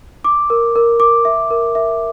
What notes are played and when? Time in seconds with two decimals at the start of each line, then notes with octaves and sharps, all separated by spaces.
0.24 D6
0.50 A#4
0.76 A#4
1.00 D6
1.25 E5
1.50 A#4
1.75 E5